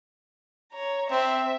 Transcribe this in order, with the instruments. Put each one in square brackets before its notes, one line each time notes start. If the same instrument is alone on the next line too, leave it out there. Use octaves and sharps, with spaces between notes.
[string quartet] C#5 A#5
[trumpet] C4 [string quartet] E5